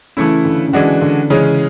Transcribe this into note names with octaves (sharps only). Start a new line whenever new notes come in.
C#3 E3 A3 E4
D3
C#3
D3 E3 G#3 D4 F#4
D3
C#3 E3 G#3 C#4